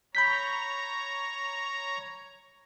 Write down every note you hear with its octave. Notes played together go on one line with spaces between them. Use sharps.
C#5 A#5 B5 G6 B6